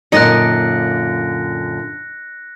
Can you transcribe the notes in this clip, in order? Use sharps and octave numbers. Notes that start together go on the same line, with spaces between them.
F#2 A#2 D3 D#4 D#5 F#6 A#6 C#7